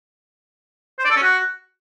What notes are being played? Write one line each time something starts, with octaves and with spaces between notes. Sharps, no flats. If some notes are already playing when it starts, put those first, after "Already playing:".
C5
D5
A4
C#4
F#4